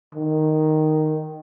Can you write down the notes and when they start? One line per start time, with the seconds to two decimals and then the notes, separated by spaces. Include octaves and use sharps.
0.15 D#3